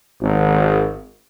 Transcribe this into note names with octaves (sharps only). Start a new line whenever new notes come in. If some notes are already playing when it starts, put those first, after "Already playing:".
G#1